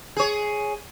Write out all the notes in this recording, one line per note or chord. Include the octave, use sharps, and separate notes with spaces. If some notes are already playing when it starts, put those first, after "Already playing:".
G#4 C#5